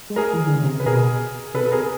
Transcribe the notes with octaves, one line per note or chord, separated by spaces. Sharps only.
G#3
A3 G#4 A#4
E3
D#3
D3
C#3
C3
B4
B2 G#4 A#4
C3 A4 B4
B2
A4
C3 G#4 A#4